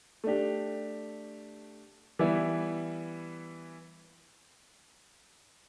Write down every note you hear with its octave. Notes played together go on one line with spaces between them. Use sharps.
A3 D4 G4
E3 G3 B3 E4